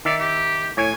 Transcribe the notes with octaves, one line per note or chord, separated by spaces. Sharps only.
D#3 D5 E5
G4
A2 C#5 G#5